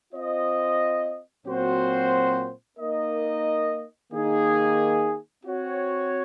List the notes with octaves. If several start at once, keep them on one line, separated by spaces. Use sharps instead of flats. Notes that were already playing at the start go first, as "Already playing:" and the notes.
C4 F4 C5 D#5
A#2 F#3 C4 F#4 C5
A#3 D#4 A#4 D#5
D#3 A#3 D#4 G#4
C4 F#4 C#5